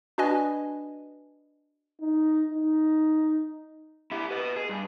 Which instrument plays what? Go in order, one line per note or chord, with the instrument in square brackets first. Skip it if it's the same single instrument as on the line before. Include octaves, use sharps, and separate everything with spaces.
[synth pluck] D4 F#4 B4 D#5 G#5
[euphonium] D#4
D#4
[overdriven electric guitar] E4 G4
B4 D#5
G#4
G2